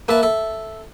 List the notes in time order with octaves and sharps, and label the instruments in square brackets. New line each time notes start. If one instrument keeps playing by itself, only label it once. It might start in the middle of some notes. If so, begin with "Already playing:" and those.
[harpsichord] A#3 A5 [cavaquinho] B4 E5
[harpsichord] A4 [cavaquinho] E5